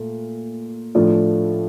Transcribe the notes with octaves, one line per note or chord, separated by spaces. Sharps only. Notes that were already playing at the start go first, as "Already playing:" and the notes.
Already playing: A#2 A3
A2 F3 A3 D4 F4